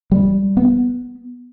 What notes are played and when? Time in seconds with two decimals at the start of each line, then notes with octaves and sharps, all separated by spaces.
0.11 G3
0.57 B3